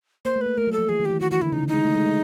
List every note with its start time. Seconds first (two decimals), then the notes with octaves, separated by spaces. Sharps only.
0.25 A#3 C5
0.36 A3
0.41 A#3 B4
0.58 A3 A#4
0.67 F#3
0.72 A4
0.78 F3
0.89 E3 G#4
1.00 D#3
1.05 G4
1.10 E3
1.21 D#3 F#4
1.31 E3 F#4
1.42 D3 E4
1.52 C#3 D#4
1.63 D3
1.68 D#4
1.74 G#3
1.85 A3
1.95 G#3
2.06 G#3